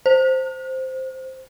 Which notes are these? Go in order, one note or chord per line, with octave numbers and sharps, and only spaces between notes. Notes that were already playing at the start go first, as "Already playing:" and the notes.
C5